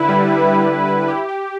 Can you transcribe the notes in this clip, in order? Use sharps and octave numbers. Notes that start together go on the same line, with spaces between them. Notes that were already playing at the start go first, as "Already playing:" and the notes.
Already playing: D3 E4 B4
G3
D3
E4
G3
E4
G4
G4